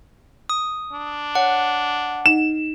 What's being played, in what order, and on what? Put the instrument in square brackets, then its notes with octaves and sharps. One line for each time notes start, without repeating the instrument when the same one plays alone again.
[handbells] D#6
[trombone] D4
[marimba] C#5 [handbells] F#5
[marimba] D#4 D#5 [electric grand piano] E7